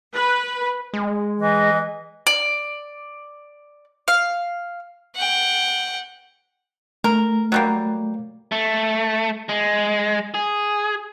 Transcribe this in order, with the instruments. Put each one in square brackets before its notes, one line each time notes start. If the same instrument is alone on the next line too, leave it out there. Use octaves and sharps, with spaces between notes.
[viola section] B4
[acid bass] G#3
[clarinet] E3 [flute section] D#5
[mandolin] D5
F5
[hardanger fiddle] F#5 G5
[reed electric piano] A3 [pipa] A#4
[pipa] F#3 G3 A#3
[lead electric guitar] A3
G#3
G#4